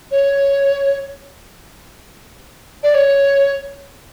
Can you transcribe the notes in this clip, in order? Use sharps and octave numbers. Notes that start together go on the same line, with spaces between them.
C#5
D5
C#5